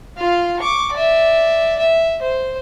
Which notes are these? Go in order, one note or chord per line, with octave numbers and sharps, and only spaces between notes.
F4 F5
C#6 D6
D5 E5
E5
C5